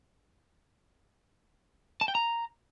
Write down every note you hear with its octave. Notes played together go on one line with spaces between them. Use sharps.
A5
G5
A#5